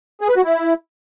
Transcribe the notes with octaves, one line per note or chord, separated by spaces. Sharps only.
G#4
B4
F#4
E4